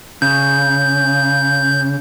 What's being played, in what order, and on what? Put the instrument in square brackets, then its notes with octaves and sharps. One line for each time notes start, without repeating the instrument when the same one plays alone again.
[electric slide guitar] C#3 [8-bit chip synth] G6